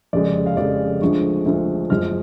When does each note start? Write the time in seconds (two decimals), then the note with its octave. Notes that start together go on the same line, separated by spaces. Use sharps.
0.13 F1 F2 C#3 G#3 D5
0.46 F5
0.57 F1 F2 C#3 G#3 D5
1.01 D2 D3 F3 G#3 C#6
1.46 D2 D3 F3 G#3
1.90 F#1 F#2 F3 G#3 F6